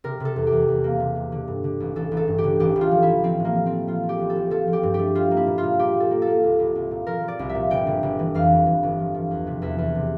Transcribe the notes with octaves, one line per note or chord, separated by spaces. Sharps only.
C3 A#4
C3 A4
E2
G4
E2
E2
A#3
C3
C3
D3
G2
D3
A1
A1 A4
A1
A4
G2
G4
D3
A1 G4
A1
F4
F3
F3 E4
F3 C4
A2
A#3
F3
C4
A3
F3 F4
A3
G4
A1
A4
A1
F3 A4
F3
G4
G2
G4
A3
G3 F4
A#3
E4
A#2
F4
A#2
A#2 G4
G3 A4
A#3
A4
A#3
C2
C2
C2
A#2
F3 A#4
F3
D5
C2
E5
A#2
G1 G5
G1
G1
E3
F2 F5
G1
E3
G1
F3
F3
E2
C3
E2 E5
E2
C3